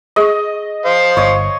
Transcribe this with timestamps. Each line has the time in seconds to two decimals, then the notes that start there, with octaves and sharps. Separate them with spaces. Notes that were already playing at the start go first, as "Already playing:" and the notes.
0.16 G#4 D#5 C#6
0.86 C5 F5
1.17 G1 C#5 D#5